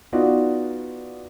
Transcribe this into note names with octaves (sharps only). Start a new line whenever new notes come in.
B3 D#4 F4 F#4 D5